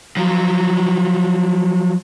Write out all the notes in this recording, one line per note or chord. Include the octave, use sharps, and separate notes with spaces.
F3 F#3